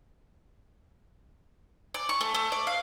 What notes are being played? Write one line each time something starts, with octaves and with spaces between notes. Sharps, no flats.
D5
C#6
A3
A3
D5
F5